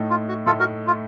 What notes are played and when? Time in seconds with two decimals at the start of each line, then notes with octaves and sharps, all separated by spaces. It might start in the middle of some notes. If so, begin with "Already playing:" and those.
Already playing: A2 A3 D#4
0.10 F4
0.29 F#4
0.46 A2 A3 D#4 F4 A4
0.59 F#4 A#4
0.87 F4